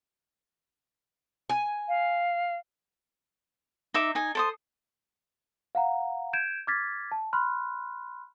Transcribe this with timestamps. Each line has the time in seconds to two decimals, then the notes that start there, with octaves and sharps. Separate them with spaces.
1.49 G#5
1.88 F5
3.94 D#4 E5 D6
4.15 D#4 G#5
4.35 A4 C5 D#6
5.75 F5 F#5 A#5
6.33 G6 G#6 D7 E7
6.67 D6 F6 G#6 A6 B6
7.12 A5
7.33 B5 C6 F6 F#6